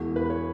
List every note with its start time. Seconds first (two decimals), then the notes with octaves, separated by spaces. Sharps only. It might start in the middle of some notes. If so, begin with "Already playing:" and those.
Already playing: E1 E2 E3 F#4
0.16 B4
0.30 C#5